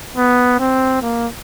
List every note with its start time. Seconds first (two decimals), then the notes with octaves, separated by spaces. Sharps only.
0.16 B3
0.60 C4
1.02 A#3